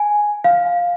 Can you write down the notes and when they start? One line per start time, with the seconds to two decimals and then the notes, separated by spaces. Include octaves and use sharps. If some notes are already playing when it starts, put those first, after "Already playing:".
Already playing: G#5
0.44 F5